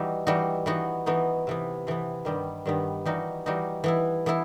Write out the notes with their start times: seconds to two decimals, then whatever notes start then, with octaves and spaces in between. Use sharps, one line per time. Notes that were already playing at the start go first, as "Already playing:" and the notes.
Already playing: E3 G3 D#4 F#4
0.27 E3 G3 D#4 F#4
0.66 E3 B3 D#4 F#4
1.06 E3 B3 D#4 F#4
1.47 C3 E3 B3
1.87 C3 E3 B3
2.25 G2 D#3 G3 B3
2.66 G2 D#3 G3 B3
3.05 E3 G3 D#4 F#4
3.46 E3 G3 D#4 F#4
3.84 E3 B3 E4
4.26 E3 B3 E4